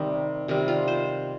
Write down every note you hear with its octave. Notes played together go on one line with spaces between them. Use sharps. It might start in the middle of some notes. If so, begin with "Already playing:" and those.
Already playing: C3 D#3 G3 C4 D#4
C3 D#3 G3
F4
C5